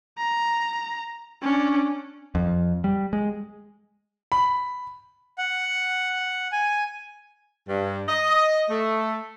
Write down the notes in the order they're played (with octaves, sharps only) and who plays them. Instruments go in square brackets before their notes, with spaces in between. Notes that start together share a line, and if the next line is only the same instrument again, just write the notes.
[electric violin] A#5
C#4 D4
[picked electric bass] F2
G3
G#3
[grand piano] B5
[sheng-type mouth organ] F#5
G#5
[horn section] G2
D#5
A3